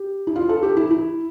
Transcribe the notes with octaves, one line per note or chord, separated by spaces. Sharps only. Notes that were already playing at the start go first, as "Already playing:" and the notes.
Already playing: G4
E4
F4
A4
G4
E4
E4